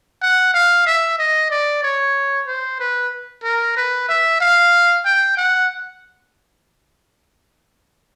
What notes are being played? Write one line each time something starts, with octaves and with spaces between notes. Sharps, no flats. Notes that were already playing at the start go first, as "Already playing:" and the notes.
F#5
F5
E5
D#5
D5
C#5
C5
B4
A#4
B4
E5
F5
G5
F#5